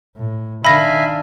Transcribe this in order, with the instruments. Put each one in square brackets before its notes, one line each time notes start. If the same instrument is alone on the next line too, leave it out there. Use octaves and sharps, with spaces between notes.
[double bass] A2
[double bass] D#3 D4 [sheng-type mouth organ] E5 F5 G#5 [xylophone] B5 A#6